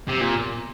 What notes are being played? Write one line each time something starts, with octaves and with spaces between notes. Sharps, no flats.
C3
A#2